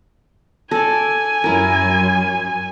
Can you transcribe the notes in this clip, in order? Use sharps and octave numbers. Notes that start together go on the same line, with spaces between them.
A4 D5 G#5
F#2 E4 A#4